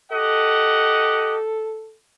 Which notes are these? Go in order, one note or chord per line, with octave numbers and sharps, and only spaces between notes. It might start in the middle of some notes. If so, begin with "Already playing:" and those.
G4 A4 D#5 F#5